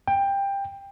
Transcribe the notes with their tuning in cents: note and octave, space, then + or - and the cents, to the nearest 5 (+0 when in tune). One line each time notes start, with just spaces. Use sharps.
G5 +15